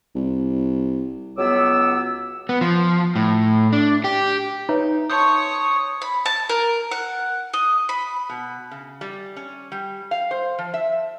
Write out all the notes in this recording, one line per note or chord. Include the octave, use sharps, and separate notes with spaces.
C2
C#2 F#3 B3 C#5 D6 E6
B3
F3
A2
D4
G4
D#4 B4 C#5 E5
C#5 A5 C6 C#6 D#6 G6
B5
A5
A#4
F#5
D#5
B5
B2
C#3
G3
C#4
G3
F5
C5
F3
E5